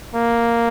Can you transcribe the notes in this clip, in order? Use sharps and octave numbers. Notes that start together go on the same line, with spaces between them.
A#3